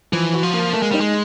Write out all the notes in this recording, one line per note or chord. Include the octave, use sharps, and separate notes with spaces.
E3 F3
F#4
F3
A#3
A3 A#3
G#3
G3 D#4
G#3